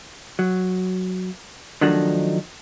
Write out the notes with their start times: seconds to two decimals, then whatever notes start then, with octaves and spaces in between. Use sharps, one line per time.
0.39 F#3
1.81 D#3 F3 F#3 A3 D4 D#4